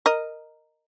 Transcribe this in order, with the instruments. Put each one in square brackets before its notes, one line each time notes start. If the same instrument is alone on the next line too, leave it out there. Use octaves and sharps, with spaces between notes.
[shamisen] A#4 D#5